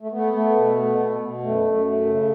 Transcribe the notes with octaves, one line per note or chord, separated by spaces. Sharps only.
A3
A3 B3
A3
B2
A3
B2
B2
F#2 A3
F#2
A3
C#3